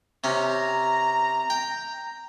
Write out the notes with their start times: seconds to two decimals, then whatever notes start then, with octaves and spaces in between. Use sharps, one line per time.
0.24 C3 C#4 A#5
1.50 G5